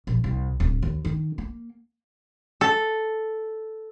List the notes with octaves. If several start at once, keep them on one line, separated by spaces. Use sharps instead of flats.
A#1
C2
D1
D#2
D#3
A#3
A4